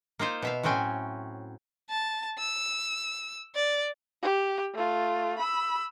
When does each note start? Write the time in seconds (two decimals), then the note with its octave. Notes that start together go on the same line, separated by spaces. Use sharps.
0.19 A#3 D#4 F4 C5
0.42 B2 E5 F5
0.63 A2 F#3 C4 C#4 G5 G#5
1.90 A5
2.39 E6
3.55 D5
4.22 G4
4.74 A3 F4
5.39 B5 E6